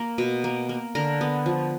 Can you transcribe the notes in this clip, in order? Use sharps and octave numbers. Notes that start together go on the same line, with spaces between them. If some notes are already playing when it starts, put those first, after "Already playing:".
Already playing: A#3
B2
A#3
A#3
D3 A#4
B3
F3